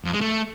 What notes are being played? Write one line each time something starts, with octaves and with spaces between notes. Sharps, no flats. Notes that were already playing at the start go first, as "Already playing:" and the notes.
F2
G#3
A3